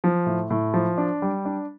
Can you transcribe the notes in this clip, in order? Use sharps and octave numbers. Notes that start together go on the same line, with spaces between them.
F3
A2
A2
F3
D4
G3
D4